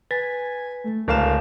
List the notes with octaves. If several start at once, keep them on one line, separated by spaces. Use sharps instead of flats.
B4 G#5 A6 B6
A3
D1 C#2 A#4 F5 E7